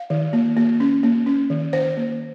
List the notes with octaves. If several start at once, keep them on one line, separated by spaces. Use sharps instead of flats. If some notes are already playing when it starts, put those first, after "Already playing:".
Already playing: F5
D#3
A#3
A#3
C#4
A#3
C#4
D#3
D#3 C5
A#3